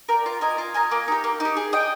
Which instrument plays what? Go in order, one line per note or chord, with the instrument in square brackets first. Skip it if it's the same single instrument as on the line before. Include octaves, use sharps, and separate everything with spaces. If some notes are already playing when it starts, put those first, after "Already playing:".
[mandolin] A#4 D5 G5
F4
A#4 D#5 G#5
F4
A#4 D#5 G#5
A#3
D#4 G4
A#3
D#4
G4
G#4
D#5 G5